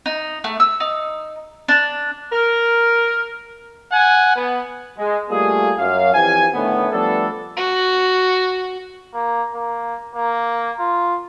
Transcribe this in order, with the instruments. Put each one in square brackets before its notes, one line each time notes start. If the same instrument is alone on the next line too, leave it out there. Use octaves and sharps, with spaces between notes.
[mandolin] D#4
A3
E6
D#4
D4
[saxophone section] A#4
[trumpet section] F#5 G#5
B3
[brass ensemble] G#3
G3 A3 A#3 F4 G#4
F#2 F5
F2 E3 F3 G4 G#5
A2 D3 D#3 A3 B3
F3 G3 A3 B3 D4 A4
[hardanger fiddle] F#4
[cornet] A#3
A#3
A#3
F4